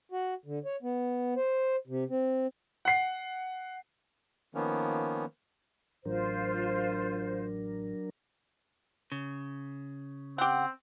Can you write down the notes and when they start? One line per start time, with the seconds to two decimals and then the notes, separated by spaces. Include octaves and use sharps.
0.12 F#4
0.46 D3
0.65 C#5
0.82 B3
1.36 C5
1.87 C3
2.10 C4
2.85 F#5 C7
4.55 D#3 F3 A#3 B3 C#4
6.05 A1 F#3 D4 F4 A#4 C5
9.12 C#3
10.38 C4 G4 F#5